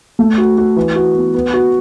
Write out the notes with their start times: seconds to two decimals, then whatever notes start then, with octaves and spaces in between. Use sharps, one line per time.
0.19 A3
0.38 F#4
0.58 F#4
0.76 E3
0.96 F#4
1.15 B3
1.34 B3
1.54 F#4